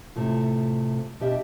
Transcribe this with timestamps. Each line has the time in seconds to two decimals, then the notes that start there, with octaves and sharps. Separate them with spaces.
0.16 A2 C3 A3 F4
1.20 B2 D4 G4 E5